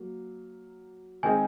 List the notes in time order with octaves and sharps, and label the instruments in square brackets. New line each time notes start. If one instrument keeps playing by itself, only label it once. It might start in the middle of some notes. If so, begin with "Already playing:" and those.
Already playing: [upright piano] F#3 A#3
[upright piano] D#3 G#3 C4 D#4 G#4 [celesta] G#5